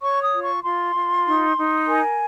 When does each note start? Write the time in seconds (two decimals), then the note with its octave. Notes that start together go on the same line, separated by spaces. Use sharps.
0.02 C#5 C#6
0.23 D#6
0.33 F4
0.43 C#6
0.63 F4 C6
0.95 F4
1.26 D#4
1.56 D#4
1.87 A#4 G#5